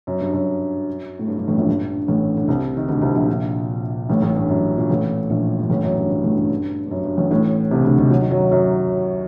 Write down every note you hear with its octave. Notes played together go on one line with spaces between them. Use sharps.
F#2
G2
F#2
A2
G2
G2
A1 A2
A#1 A#2
G2
A1 A2
D3
C2 C3
D#3
D2 D3
C2 C3
A#1 A#2
A1 A2
A1 A2
G2
F#2
A#2
A1 A2
A#1 A#2
G2
A1 A2
F#2
G2
G2
A1 A2
G2
G2
G2
F#2
G2
A1 A2
A1 A2
C2 C3
D2 D3
D#2 D#3
F#3
D#3
F#2 F#3
F#2 F#3